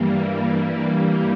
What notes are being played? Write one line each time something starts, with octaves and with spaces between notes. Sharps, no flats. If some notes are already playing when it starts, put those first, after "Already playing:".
Already playing: G2 E3 G3 A#3